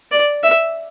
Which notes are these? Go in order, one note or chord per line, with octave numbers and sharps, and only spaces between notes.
D5
E5